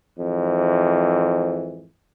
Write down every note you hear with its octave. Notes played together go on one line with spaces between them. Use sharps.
F2 G#2 E3